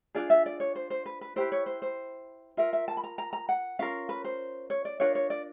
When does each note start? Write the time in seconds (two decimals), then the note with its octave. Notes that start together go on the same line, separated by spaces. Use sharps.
0.15 D4 F4 G#4 D5
0.30 E5
0.46 D5
0.60 C#5
0.75 C5
0.90 C5
1.06 B4
1.21 B4
1.36 E4 G4 B4 C5
1.52 C#5
1.66 C5
1.82 C5
2.57 F4 A#4 E5
2.73 E5
2.88 A5
2.97 B5
3.04 A#5
3.18 A#5
3.33 A#5
3.49 F#5
3.79 C#4 F4 A#4 F5
4.09 B4
4.25 C5
4.70 C#5
4.85 D5
5.00 D4 F4 A#4 C#5
5.15 C#5
5.30 D5